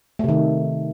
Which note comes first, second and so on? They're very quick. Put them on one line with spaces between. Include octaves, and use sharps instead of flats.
A3 C3 D#3